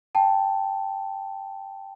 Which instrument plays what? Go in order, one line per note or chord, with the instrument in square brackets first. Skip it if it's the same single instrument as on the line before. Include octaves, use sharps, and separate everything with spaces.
[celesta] G5 A5